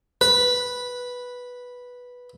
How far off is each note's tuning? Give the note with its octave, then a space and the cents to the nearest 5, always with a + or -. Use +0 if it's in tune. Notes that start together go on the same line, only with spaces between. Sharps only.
B4 -5